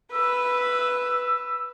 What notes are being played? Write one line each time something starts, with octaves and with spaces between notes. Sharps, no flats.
B4 E6